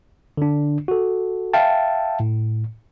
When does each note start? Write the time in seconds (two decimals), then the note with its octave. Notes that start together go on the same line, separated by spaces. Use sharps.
0.37 D3 D4
0.88 F#4 A4
1.54 E5 F5 G5 A5
2.20 A2